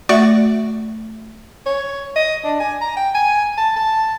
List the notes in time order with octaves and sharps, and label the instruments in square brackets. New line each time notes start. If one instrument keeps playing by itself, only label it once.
[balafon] A3 E5 [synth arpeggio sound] F#4 D5 C#6
[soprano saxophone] C#5
D#5
D4
G#5
A#5
G5
G#5
A5
A5